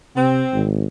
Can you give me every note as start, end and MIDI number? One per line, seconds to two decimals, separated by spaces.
0.16 0.43 48
0.16 0.63 60
0.54 0.85 32